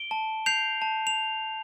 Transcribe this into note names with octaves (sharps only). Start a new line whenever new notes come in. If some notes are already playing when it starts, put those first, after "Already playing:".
Already playing: D7 G7
A5
G6 C7 F7
A5
F7